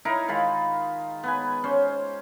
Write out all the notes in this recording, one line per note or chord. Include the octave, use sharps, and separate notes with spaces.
D#4 E4 A#4
D#3 G#3 F4 B5
B3 B4 G#5
C#4 C5